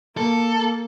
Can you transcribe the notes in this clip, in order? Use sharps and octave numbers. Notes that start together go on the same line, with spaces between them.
A#3 A4